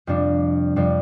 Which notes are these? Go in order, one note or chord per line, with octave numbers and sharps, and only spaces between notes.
F2 C3 G3 D4 F4
F2 C3 G3 D4 F4